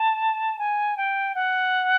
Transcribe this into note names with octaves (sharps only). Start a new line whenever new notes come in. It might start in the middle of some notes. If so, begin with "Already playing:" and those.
Already playing: A5
G#5
G5
F#5